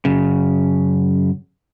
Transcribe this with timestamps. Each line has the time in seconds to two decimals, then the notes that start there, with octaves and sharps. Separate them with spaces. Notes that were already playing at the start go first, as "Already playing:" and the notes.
0.05 F#2 C#3